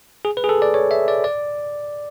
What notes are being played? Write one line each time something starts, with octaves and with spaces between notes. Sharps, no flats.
G#4
B4
G#4
A4
D5
C#5
E5
D5
D5